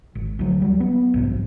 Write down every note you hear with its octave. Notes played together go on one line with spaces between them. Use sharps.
G#1
D2 F#3
F#3 G3
B3
B1 G#2 C3